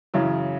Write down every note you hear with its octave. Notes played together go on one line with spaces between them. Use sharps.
F#2 C#3 E3